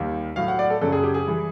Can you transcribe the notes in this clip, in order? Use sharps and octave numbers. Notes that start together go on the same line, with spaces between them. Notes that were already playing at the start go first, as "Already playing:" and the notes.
Already playing: D#2 D#3 G3
A2 F#3 F5
F#5
D5
A4
F#2 C#3 F#3 A4
G#4
G4
G#4
E3 G3